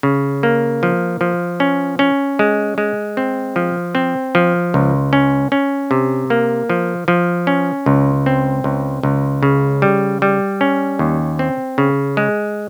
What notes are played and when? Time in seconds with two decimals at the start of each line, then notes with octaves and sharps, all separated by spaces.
0.03 C#3
0.43 A#3
0.83 F3
1.21 F3
1.60 C#4
1.99 C#4
2.39 G#3
2.78 G#3
3.17 C4
3.56 F3
3.95 C4
4.35 F3
4.74 C#2
5.13 C#4
5.52 C#4
5.91 C3
6.30 A#3
6.70 F3
7.08 F3
7.47 C#4
7.86 C#2
8.26 C4
8.64 C#2
9.03 C#2
9.43 C#3
9.82 G3
10.22 G3
10.61 C#4
10.99 D#2
11.39 C4
11.78 C#3
12.17 G#3